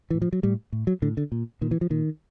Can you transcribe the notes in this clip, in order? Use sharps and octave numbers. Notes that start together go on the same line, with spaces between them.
A2 E3
F3
F#3
A2 G3
A2
F#3
A2 D3
D3
A#2
A#2 D#3
E3
F3
A#2 D#3